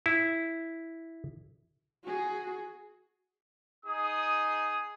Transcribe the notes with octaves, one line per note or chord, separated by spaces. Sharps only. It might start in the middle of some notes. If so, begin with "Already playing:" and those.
E4
F#4 G#4
D#4 G#4 D#6